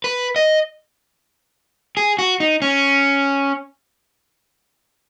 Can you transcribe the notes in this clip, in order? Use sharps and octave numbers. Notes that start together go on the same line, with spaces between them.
B4
D#5
G#4
F#4
D#4
C#4